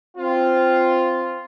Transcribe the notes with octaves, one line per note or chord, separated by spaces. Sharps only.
C4 F4